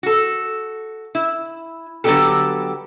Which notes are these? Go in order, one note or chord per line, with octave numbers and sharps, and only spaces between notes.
F#4 A4
E4
D3 F#3 G3 B3 G4 A4